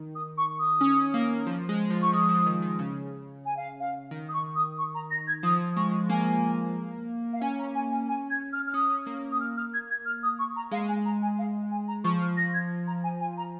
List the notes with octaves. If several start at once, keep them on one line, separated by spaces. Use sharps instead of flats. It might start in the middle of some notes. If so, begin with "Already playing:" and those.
Already playing: D#3
D#6
C#6
D#6
C#4
A#3
F3
G#3
G#3
F3
C#6
G#3 D#6
F3
D#3
D#3
C#3
G#5
F5
F5
D#3
D#6
C#6
D#6
C#6
A#5
A#6
G#6
F3 D#6
G#3 C#6
A#3 G#5
F5
C#4 G#5
A#5
G#5
G#5
G#5
G#6
F6
F6
C#4 D#6
A#3
D#6
F6
F6
G#6
G#6
F6
D#6
C#6
A#5
G#3 F5
G#5
A#5
G#5
F5
G#5
A#5
F3 C#6
F6
A#6
G#6
A#5
G#5
G#5
A#5